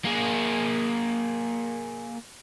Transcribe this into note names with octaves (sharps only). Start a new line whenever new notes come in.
A#3 G#4